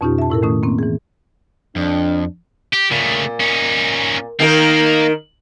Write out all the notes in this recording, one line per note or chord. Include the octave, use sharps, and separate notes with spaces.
F2 B2 C#4 D#4 F4 G4
E5 A5
A2 E4 A4 A#4
D#3 A3 C#4 D#6
A#3 C4 C#4
E3 G#4
F2 D4
G4
A#2 C#3 A3
C#4 D#4
D#3 A#3 D#4 A#4